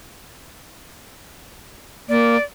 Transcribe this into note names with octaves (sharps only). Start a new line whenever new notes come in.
A#3 D5